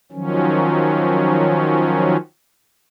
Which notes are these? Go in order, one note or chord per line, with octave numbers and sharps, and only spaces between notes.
D#3 F3 F#3 C#4